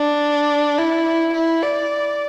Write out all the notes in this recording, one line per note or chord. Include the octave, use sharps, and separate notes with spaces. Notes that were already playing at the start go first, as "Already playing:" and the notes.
Already playing: D4
E4
E4
D5